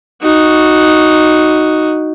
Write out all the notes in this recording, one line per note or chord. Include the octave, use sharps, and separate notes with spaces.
D#4 F#4